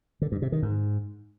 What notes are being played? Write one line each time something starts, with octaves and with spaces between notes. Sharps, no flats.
D3
G2
C3
D#3
G#2